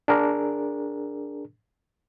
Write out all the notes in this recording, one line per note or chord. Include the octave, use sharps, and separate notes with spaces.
D4 G#4 A#4